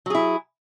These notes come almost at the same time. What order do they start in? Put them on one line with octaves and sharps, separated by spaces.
F#3 G#4 E4